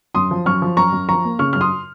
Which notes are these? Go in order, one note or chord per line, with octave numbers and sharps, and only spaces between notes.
F#2 C6 D#6
F3
F#2 C#6 F6
F3
F#2 A#5 C#6
F#2
F3 A#5 C#6
A#3
C#3 C#6 F6
F#2 F6
C6 D#6